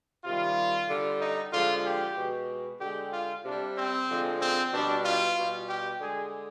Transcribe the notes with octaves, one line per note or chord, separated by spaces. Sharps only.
C3 D#3 G3 F4
D3 G3
D#4
D3 F3 G#3 F4
G4
B2 G#3
D3 G#3 G4
F4
C3 G3 D4
C4
D3 F3 G#3
C4
B2 G3 D4
F4
B2 G3
G4
D3 G#3 G#4